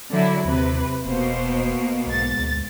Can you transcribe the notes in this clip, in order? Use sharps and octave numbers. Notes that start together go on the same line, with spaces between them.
D3 F#3 E4
D#2 C3 B4
E1 B2 A#3 C5
B1 G#2 A6
D2